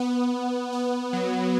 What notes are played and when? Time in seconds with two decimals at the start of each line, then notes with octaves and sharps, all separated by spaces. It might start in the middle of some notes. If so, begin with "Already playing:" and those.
Already playing: B3
0.73 B3
1.13 F#3